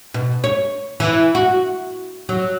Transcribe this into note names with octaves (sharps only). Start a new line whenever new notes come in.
B2
C#5
E3
F#4
F#3